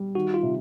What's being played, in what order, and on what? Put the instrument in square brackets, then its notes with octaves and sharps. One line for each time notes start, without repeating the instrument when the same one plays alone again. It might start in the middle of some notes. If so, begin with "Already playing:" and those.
Already playing: [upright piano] G3
[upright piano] D#3 [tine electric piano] F#4
[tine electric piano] F4
[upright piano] C3